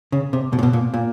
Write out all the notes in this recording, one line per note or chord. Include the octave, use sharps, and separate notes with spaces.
C#3
C3
B2
A#2
B2
A#2
A#2